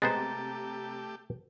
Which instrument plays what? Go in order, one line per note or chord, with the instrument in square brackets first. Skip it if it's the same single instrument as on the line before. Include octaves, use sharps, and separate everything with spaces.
[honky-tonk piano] C3 [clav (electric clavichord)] G#3 B3 C5 [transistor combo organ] A3 G4 [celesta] A#5 A6